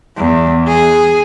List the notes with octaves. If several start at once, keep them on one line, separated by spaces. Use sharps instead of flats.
E2
G#4